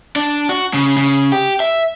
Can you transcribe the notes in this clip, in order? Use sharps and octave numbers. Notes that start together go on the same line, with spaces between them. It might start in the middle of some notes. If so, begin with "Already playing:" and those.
D4
F#4
C#3
C#3
G4
E5